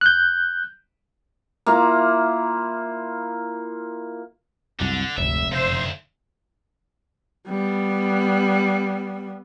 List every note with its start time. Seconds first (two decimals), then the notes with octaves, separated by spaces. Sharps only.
0.01 F#6 G6
1.66 A#3 E4 F4 A#5
4.80 C2 F#2 D3
5.17 F1 D2 G#2 E5
5.52 F#1 A#2 D3 C5 E5
7.47 G3 B3